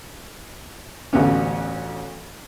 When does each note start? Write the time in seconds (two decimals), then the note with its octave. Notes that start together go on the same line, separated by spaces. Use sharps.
1.13 A1 D2 B3 C#4